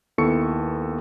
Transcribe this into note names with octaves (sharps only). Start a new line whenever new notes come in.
D#2 B3 E4 A4 C#6 C#7